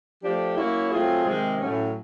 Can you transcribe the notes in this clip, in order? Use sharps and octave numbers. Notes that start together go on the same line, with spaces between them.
F3 A3 D4 G4
F#3 A#3 C#4 E4
F#3 A3 C4 F4 G#4
C3 D#3 G#3 C4
A2 F#3 A3 C#4